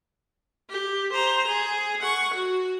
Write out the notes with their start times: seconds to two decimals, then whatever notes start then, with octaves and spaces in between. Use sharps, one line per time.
0.70 G4
1.12 C5 A#5
1.47 G#4
2.01 F#5 C#6
2.34 F#4